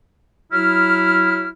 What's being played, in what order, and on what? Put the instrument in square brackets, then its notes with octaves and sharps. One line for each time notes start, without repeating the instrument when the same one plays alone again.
[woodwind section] F#3 E4 F6